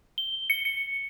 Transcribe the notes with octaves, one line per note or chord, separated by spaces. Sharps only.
G7
C#7
C#7